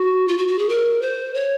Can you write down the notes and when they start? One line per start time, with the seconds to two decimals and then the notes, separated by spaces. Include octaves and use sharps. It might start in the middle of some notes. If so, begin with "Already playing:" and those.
Already playing: F#4
0.28 F4
0.38 F#4
0.48 F#4
0.59 G#4
0.69 A#4
1.02 C5
1.34 C#5